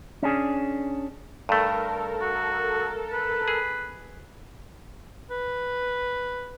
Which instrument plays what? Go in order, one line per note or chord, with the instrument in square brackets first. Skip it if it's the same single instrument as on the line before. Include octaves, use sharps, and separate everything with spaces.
[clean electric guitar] C#4 D4 G#4
[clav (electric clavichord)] G2 A3 [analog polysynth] A4 A#4
[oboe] F#4
B4
[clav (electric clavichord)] G#4
[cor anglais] B4